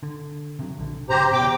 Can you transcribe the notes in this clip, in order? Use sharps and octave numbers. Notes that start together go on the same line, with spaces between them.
D3
C3 F#3
A#1 D3
G1 C#3 G4 C5 A#5
E2 B2 G5 D6